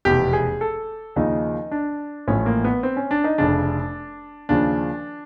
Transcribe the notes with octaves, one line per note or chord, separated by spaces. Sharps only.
F1 E2 B2 G4
G#4
A4
D#2 C#3 F3 D#4
D4
A1 A2 F3 C#4
A#3
B3
C4
C#4
D4
D#4
F1 F2 C#3 D4
D#2 C#3 F3 D4